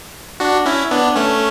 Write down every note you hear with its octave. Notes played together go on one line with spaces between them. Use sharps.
D4 F#4
C#4 E4
B3 D4
A3 C#4